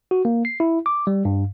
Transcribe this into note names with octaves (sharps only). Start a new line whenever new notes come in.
F#4
A#3
C7
E4
D6
G3
G2